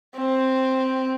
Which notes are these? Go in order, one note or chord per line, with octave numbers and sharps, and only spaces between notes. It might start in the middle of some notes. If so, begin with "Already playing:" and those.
C4